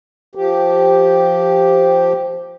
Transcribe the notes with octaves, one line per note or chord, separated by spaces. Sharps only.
F3 G4